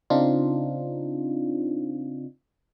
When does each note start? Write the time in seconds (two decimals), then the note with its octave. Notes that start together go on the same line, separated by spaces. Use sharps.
0.10 C#3 C4 D4 D#4 F4